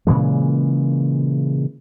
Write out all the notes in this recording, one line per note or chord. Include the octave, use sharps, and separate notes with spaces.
A#2 C#3 E3 G#3